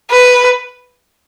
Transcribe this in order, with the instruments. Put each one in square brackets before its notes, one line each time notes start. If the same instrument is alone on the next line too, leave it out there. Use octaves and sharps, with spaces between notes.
[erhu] B4